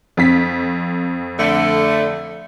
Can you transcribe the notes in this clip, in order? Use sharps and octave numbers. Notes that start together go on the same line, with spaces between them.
F2 C4 B6
D3 A3